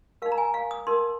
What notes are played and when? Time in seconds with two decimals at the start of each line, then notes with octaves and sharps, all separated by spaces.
0.22 D#4 A#4 F5
0.32 A#5
0.38 G#5
0.54 F5
0.71 D#6
0.87 D#4 A#4 C6